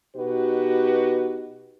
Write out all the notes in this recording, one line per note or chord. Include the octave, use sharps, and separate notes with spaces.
B2 D#4 F#4 G4 B4